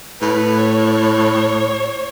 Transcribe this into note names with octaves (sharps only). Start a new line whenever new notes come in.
A2 B4
C#5